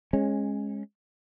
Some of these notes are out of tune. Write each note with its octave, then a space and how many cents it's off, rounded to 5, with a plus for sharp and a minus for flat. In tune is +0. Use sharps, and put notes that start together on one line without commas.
G#3 +0 C#4 -20